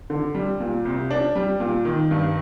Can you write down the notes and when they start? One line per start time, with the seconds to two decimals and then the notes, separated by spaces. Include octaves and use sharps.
0.10 D3
0.35 G3
0.60 A#2
0.85 C2
1.11 D4
1.35 G3
1.60 A#2
1.85 D#3
2.11 G2